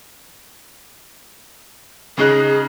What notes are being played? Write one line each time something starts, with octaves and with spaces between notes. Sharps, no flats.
C#3 D#4 G#4 F#6